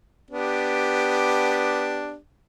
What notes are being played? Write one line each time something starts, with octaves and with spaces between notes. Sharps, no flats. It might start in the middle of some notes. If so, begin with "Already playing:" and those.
B3 D4 G4